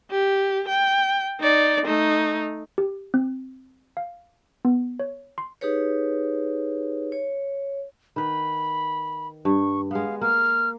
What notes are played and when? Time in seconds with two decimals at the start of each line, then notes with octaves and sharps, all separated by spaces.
0.11 G4
0.69 G5
1.40 D#4 D5
1.86 A3 D#4
2.78 G4
3.14 C4
3.97 F5
4.65 B3
4.99 C#5
5.38 C6
5.61 D#4 G4 G#4 B4 C#5
7.12 C#5
8.16 D#3 B4 B5
9.45 G2 C#6
9.91 G#3 B3 F5
10.21 A#3 F6